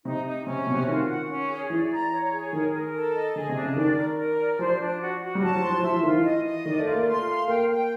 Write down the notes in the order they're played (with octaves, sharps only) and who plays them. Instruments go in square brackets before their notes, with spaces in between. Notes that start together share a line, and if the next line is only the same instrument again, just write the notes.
[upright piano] C3 [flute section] D#4
[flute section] D#4
[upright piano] C3 [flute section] C#4
[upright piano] B2 [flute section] F#4
[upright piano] C3
[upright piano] D#3 [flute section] F4
[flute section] F#5
C#4
G#4
[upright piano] E3 [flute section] D5
[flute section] A#5
C#5
G#4
[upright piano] D#3 [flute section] A#4
[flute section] A#4
A4
D#5
[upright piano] D3 [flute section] G#4
[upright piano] C3
[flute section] D4
[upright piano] C#3
[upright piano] D#3 [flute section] D5
[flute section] A#4
A#4
D5
[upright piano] F3 [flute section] C5
[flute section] D4
F#4
F#4
[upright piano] G3
[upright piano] F#3 [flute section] A5
[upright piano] F3
[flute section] C6
[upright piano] F3
[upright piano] F3 [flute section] E5
[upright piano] E3
[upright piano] D#3 [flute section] F4
[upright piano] E3
[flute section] D#5
D#5
[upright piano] D#3 [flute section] D5
[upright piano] A3
[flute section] F4
[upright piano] A#3
[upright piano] A3 [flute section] C6
[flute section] F5
[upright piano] A#3 [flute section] G5
[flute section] G5